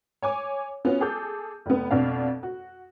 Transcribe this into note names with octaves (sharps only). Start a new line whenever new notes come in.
C#5 G#5 D6
B3 C#4 F4 F#4
G#4 A4 D6 G6
F1 B3
F2 B2 D4 F5
F#4